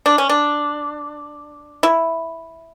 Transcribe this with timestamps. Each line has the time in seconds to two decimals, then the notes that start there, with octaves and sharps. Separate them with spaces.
0.06 D4
0.18 C#4
0.29 D4
1.83 E4